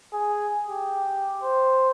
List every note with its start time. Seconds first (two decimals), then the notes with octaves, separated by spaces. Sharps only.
0.13 G#4
0.68 G4
1.43 C5